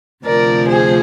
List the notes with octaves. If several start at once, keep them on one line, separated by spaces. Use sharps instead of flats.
D2 C3 F3 A#4 D5
G#4 C5